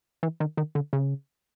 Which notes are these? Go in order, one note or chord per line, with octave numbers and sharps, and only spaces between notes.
E3
D#3
D#3
D3
C#3